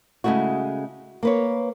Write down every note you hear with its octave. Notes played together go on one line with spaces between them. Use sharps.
C#3 G#3 A3 E4 F#4
A#3 B4 C#5